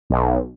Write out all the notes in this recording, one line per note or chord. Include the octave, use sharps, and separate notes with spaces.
B1